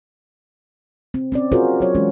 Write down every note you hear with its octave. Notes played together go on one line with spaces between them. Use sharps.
C4
C4 C#4 D5
C4 F4 F#4 G#4 A#4 C5
F#3 C#5
E3 G#3 C#4